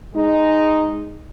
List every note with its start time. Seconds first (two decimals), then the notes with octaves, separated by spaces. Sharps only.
0.14 G#3 D#4